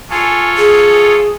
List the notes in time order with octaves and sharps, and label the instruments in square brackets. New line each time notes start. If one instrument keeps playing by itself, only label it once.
[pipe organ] F4 A4 C#5 [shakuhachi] G#5
[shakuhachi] G#4